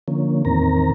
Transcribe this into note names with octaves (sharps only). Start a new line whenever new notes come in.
D3 F3 A#3 C#4
E2 A2 D#3 C4 A#4 A#5